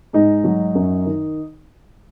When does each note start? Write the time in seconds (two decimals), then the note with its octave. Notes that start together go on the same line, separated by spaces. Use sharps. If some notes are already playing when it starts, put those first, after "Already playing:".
0.13 G#2 D#4
0.44 F#3
0.75 F#2
1.05 D#3